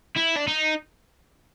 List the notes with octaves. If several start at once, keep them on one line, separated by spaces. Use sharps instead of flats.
E4
D4
D#4